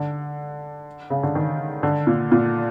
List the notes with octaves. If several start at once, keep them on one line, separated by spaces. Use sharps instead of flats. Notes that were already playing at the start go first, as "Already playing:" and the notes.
Already playing: D3
C#3
D3
D#3
D3
A#2
A#2